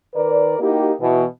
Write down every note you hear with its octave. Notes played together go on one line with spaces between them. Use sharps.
D#3 A#4 B4 D5
A#3 D#4 E4 F#4 G4
B2 E3